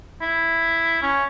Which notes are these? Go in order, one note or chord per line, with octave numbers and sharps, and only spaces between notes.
E4
C#4